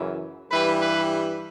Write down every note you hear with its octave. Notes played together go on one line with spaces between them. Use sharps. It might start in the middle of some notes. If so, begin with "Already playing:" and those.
Already playing: F#2 C#3 E3
G2 E3 G3 B4
B4